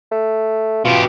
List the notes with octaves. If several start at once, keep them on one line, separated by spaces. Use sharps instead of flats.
A3
B2 F4 G4